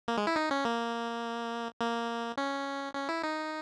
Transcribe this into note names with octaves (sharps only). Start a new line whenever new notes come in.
A#3
G#3
E4
D#4
C#4
A#3
A#3
C#4
C#4
E4
D#4